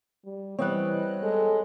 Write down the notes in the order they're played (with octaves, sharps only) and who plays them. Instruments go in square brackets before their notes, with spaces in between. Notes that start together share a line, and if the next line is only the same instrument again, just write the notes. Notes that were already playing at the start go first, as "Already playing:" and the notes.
[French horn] G3
[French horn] E3 [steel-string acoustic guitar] G3 B3 C4 [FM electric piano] C#5 D#5 F#6
[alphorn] G#3 [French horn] A4